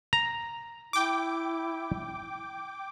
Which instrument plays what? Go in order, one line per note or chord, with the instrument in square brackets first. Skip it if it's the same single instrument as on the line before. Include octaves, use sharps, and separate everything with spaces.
[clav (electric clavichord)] A#5
[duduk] E4 [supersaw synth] G5 D6